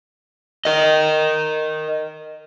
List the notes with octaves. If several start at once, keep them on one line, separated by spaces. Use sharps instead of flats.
A#4 D#5